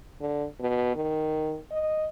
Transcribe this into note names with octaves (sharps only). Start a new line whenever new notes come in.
D3
B2
D#3
D#5